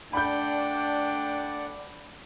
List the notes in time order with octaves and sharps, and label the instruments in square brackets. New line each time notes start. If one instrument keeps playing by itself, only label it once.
[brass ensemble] A3 D4 [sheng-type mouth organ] D5 F#5 [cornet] G5 [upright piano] B5 G6